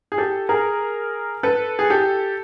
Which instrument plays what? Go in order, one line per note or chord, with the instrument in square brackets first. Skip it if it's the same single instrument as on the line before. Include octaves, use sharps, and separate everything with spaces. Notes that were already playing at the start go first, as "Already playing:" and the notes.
[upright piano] G#4
G4 A4
G#4 A#4
A4 B4
G#4
G4 A4